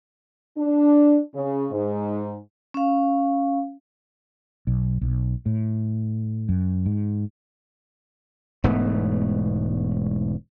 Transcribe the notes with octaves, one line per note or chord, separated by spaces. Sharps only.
D4
C#3
G#2
C#4 F5
B1
B1
A2
F#2
G#2
E1 G#2 A3 B3